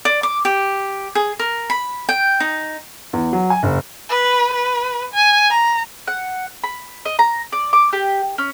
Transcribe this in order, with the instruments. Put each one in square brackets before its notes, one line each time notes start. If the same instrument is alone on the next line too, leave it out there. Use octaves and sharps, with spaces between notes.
[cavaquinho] D5
D6
G4
G#4
A#4
B5
G5
D#4
[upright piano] E2
F#3
G#5
F#1
[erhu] B4
B4
G#5
A#5
[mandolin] F#5
B5
D#5
A#5
D5
D6
G4
C#4